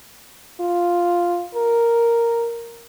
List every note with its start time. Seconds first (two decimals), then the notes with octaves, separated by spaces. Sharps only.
0.60 F4
1.55 A#4